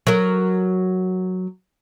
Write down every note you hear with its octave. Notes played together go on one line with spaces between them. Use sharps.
F#3 A#4